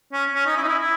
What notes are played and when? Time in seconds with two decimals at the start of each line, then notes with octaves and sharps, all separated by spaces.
0.13 C#4
0.35 C#4
0.46 D#4
0.57 E4
0.63 D#4
0.68 E4
0.79 E4